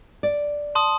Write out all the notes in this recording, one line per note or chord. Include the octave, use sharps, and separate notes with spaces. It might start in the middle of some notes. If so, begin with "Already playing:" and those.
D5
A5 C6 D#6